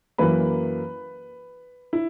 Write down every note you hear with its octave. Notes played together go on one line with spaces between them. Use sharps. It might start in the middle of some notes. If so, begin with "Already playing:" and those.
F#2 E3 A#3 B4 B5
E4